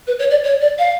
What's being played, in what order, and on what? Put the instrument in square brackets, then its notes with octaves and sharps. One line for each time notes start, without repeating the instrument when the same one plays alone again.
[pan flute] B4
C#5
D5
C#5
D5
F5